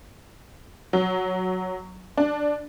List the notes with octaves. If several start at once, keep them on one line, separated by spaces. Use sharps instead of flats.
F#3
D4